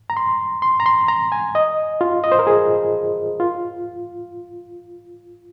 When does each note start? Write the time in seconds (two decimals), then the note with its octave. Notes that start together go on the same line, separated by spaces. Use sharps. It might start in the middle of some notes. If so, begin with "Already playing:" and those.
0.10 A#5
0.17 C6
0.62 C6
0.80 A#5
0.86 C6
1.08 A#5
1.32 G#5
1.55 D#5
2.01 F4
2.24 D#5
2.32 C5
2.39 A#4
2.47 G#4
3.40 F4